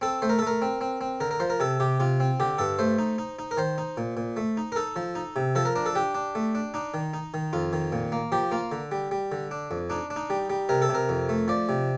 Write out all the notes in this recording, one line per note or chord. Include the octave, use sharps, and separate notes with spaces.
C4 A4
A3 C5
A#4
A4
A3 A#4
C4
C4
C4
D3 A#4
A#4
F3 C5
A#4
C3 A4
C3 G4
C3 F4
C4
D3 G4
G2 A4
A3 C5
D#4
D#4
D#4
A#4
D#3 C5
D#4
A#2
A#2
A3
D#4
A#4
D#4 A4
F3
D#4
C3
F3 A4
A#4
D4 A#4
A4
D4 G4
D4
A3
D4
D4 D#4
D#3
D#4
D#3
F2 F4
D#3
A#2
A#3
F3 G4
A#3 F4
D3
G3
G3
D3
D4
F2
D4 D#4
D4
D#4
G3
G3
C3 A#4
A4
C3
A#4
F2
A3
F3 D5
C3